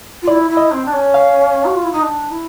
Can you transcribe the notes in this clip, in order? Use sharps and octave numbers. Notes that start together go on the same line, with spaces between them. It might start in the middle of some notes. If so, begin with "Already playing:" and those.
F4
E4 D5
E4
D#5
C4
D4
C#4
F5
F#4
F4
E4
D#4
D4
E4